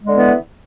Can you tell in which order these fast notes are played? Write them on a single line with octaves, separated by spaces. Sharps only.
G#3 D3 B3 E3